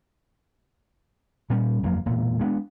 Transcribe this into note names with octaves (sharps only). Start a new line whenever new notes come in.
A#2 G3 C#4
G1 F2 F#3 A#3
E1 A#2 A3
G#3 B3 C4 D4